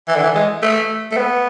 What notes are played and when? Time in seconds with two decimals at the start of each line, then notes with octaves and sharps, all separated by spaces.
0.08 E3
0.15 D3
0.23 E3
0.35 G#3
0.62 A3
1.12 A3
1.17 B3